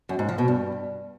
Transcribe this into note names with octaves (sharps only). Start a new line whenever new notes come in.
F#2
G#2
F3
B2
G2